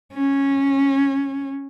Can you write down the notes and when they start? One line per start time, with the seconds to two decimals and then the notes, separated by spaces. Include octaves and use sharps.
0.14 C#4